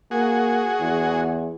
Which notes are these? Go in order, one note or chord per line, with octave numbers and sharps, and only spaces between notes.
A#3 F#4 G#4
E2